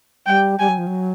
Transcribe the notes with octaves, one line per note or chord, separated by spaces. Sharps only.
G3 G5
G3 G#5
F#3
F3
F#3